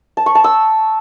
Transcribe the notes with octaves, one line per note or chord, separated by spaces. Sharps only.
A5
C#6
A5
E6